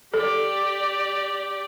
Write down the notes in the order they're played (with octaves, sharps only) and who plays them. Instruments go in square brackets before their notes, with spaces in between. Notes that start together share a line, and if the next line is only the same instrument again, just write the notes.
[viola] G4 D5 [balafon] A4